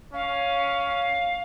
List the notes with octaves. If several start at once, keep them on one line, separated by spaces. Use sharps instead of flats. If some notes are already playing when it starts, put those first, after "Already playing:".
C#4 F5